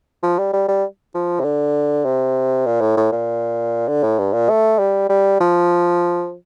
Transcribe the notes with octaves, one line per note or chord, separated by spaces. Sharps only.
F3
G3
G3
G3
F3
C3
D3
C3
A#2
A2
A2
A#2
D3
A2
G2
A#2
A3
G3
G3
F3